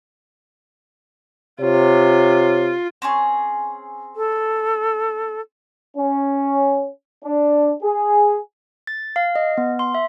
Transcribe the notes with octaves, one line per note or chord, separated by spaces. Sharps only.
C3 F4 C#5
C4 C#4 G#4
A4
C#4
D4
G#4
A6
F5
D#5
B3
C6
E5